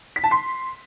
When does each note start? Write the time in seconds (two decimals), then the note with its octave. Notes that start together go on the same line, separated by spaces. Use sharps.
0.16 B6
0.24 A5
0.31 C6